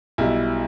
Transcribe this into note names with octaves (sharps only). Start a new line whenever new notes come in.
B1 B2 G3 E4